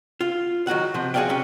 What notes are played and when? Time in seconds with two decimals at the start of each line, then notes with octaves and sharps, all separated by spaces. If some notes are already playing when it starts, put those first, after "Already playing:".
0.21 F4
0.67 D#3 F#3 F#4 F#5
0.94 C3 F3
1.14 F#4 G#4 C5 D5 F5 G5
1.29 C3 C#4